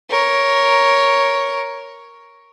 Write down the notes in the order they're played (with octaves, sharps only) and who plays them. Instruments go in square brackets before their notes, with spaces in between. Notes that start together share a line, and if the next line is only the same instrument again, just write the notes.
[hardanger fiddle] A#4 C#5